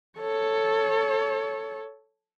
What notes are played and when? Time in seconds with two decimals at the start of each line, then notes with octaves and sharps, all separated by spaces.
0.19 A4 C#5